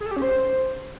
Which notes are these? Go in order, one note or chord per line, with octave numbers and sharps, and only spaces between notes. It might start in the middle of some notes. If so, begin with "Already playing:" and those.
G#4
A4
G4
C#4
C5